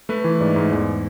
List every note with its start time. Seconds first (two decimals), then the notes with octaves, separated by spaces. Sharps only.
0.09 A3 B4
0.24 E3
0.40 G#2 D5
0.56 G#2
0.71 E2 D5